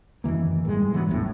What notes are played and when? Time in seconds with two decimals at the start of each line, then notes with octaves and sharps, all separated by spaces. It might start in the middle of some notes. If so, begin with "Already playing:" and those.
0.24 F#2 D#3 E3 A#3
0.65 G#2 B2 G3 G#3
0.94 E3 F#3 B3 D4
1.08 E1 C2 A2 D4